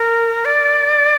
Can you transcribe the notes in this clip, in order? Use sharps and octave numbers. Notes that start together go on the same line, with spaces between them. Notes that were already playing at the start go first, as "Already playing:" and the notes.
Already playing: A#4
D5